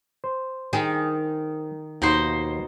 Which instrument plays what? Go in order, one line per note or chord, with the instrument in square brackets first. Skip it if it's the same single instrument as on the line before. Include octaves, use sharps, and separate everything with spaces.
[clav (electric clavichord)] C5
[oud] D#3 G#4
[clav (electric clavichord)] D#2 [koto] B2 D#4 C5